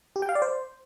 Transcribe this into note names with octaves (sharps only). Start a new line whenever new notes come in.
G4
G5
F5
D5
C5